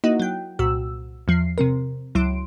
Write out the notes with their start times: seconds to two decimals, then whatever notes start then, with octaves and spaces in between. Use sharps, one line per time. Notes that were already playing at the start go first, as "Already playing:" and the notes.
0.04 A#3 D#4 E4 F#4 D#5 F#5
0.20 F#3 G5
0.59 C2 A#2 F#4 E6
1.28 E2 F3 C7
1.58 C3 C4 A#4
2.15 C#2 F#3 E4 C6 D7